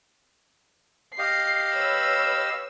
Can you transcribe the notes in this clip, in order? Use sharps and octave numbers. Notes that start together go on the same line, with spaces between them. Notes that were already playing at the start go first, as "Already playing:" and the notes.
G4 D#5 F5 C7
B4 C#5 E6